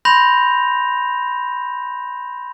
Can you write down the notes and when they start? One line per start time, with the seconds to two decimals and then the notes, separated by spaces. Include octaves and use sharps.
0.05 B5 C6 G6 A#6 F7